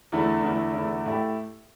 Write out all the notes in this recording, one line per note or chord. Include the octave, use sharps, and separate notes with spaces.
E2 D3 A3 E4
E2 D3 A3 E4
E2 D3 A3 E4
A2 A3 E4 G4